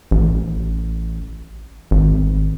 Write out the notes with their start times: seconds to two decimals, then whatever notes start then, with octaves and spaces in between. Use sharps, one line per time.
0.11 A1
1.91 G#1